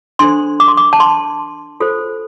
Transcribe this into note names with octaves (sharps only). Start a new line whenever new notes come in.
D4 A4 C5 C6
D6
C6
D6
A5
C6
F4 A4 C5